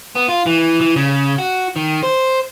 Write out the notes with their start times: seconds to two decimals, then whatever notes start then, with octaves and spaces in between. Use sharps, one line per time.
0.15 B3
0.28 F4
0.46 E3
0.81 E3
0.96 C#3
1.38 F#4
1.76 D#3
2.03 C5